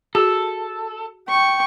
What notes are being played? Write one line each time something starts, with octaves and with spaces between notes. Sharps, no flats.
F#4 G#4 A4
G5 C#6